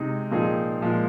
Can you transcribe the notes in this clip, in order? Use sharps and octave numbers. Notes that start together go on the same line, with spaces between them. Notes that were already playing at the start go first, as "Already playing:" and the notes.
Already playing: C3 G#3 D#4 G#4
A#2 F3 C4 D#4 G#4
A#2 F3 G#3